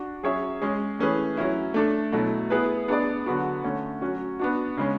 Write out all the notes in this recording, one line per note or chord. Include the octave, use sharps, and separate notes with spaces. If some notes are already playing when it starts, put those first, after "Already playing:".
Already playing: D4 F#4
F#3 C#4 G#4 C#5 E5
G#3 C#4 G#4
E3 A3 C#4 G#4 B4
F#3 C#4 E4
A3 D4 A4
B2 F#3 A3 E4
B3 E4 G#4 B4
B3 D4 G#4 D5
D3 F#3 B3 F#4
D3 A3 C#4
F#3 C#4 F#4
B3 D4 F#4
C#3 G#3 C#4